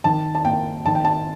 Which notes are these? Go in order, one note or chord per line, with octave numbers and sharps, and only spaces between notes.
D#3 A5
A5
A#3 G5
D#3 A5
G5
A5